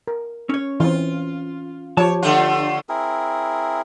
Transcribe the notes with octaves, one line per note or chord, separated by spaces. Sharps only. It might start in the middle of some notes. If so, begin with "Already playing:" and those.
A#4
C#4 C#5
E3 C4 F4
F3 G4 C#5 A5
D3 A3 F4
C4 E4 G#4 A#4